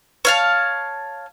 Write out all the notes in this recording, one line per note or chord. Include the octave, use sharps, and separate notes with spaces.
C#5 F5 A5